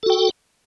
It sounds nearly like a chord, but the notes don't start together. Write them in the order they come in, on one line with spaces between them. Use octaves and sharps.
A4 F#4 G5